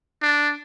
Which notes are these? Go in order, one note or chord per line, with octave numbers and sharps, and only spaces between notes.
D4